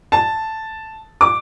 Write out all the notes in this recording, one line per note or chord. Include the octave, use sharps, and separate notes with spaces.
A5
D6